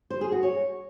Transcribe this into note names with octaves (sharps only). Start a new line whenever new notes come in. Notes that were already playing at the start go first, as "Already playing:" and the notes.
C5
G#4
F#4
C#5